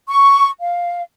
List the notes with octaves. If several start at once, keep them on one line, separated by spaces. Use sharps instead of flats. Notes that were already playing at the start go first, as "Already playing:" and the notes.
C#6
F5